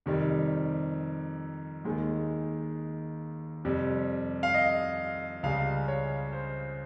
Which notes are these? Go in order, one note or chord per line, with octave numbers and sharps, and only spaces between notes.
F2 C3 D#3 G3
D#2 D#3 G#3
F2 C3 G3
F5
D#5
C#2 C#3 G3 F5
C#5
C5